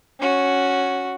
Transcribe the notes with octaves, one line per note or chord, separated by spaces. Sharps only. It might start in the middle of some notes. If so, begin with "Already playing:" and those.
C#4 F#4